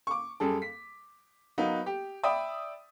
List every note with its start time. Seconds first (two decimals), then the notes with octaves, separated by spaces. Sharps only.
0.07 C#6 D6
0.40 F#2 G3 G#4 A4
0.62 B6
1.58 F#3 A#3 B3 D#4 B4
1.86 G4
2.23 D5 E5 G5 B5 D#6